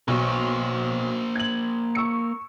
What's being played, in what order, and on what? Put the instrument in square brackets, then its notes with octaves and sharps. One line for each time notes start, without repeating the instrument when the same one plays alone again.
[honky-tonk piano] B1 C#6 [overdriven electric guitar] A#3 C5
[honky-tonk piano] G#6 F#7
C#6 E6 C#7